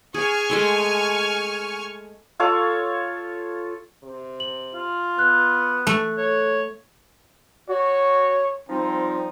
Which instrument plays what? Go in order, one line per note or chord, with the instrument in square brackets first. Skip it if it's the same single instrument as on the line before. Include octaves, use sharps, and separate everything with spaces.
[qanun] G#4 [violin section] G#5 C#6 F6
[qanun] G#3 A3 C6
[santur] F4 A4 C#5 F5
[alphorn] C3
[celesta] F#7
[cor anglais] F4
[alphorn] B3 [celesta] F#6
[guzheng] A3
[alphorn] A4 [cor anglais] C#5
[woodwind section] F#4 [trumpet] C#5
[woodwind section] F3 G3 D#4 [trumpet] C4